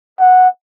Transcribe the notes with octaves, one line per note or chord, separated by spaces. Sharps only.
F#5